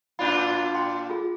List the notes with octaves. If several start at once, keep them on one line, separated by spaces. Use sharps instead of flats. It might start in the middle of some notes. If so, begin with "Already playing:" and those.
A#2 D4 F4 B5
G5 C6
F4 G#4